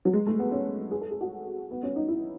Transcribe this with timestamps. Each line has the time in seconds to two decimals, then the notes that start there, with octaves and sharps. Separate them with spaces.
0.05 F#3
0.13 G#3
0.27 A3
0.39 B3
0.52 C#4
0.91 G#4
1.01 A4
1.11 G#4
1.21 F#4
1.71 B3
1.83 C#4
1.96 D#4
2.08 E4